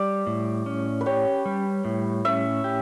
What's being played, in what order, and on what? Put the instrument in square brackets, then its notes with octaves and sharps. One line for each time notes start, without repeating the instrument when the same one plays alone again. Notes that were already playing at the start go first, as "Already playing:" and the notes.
Already playing: [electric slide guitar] G3 [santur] D5
[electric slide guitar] A2
C#4
[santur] B4
[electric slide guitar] G4 [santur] C#5
[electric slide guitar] G3
A2
[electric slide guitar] C#4 [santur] E5
[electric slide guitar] G4